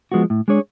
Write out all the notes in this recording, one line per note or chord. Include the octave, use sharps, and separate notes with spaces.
F3 G#3 B3 F#4
A2
G#3 D4 G#4 C#5